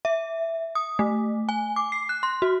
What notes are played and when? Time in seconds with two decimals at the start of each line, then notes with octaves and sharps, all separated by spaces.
0.05 E5
0.75 D#6
0.99 A3
1.49 G#5
1.76 D6
1.92 C7
2.09 F#6
2.23 C6
2.42 F#4